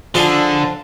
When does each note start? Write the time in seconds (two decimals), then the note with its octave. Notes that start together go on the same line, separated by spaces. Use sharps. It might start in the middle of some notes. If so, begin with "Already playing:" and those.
0.15 D3 F3 D4 F4 G#4 A4 F5